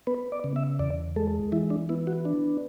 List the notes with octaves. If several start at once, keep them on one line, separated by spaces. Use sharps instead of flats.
B3 B4
D5
C#3
E5
E2 D5
G#3 A4
E3 E4
D4
B3 E4
F#4
D4